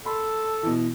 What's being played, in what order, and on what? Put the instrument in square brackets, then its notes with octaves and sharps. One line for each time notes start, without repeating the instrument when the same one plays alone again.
[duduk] A4 [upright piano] B5 C6
[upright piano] B2 E3